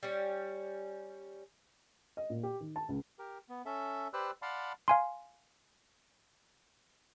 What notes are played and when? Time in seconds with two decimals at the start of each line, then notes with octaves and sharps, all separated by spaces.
0.03 G3 C#4
2.17 D#5
2.30 A#2
2.43 G4
2.60 D#3
2.76 A5
2.89 C#2
3.19 G4 A#4
3.49 B3
3.66 C#4 A4 E5
4.13 G4 B4 C5 D5 E6 F#6
4.42 D5 F5 F#5 A5 B5 C6
4.88 F5 G#5 C6